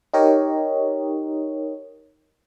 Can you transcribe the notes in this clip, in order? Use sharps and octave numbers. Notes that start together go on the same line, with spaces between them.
D#4 G4 A#4 C#5 D#5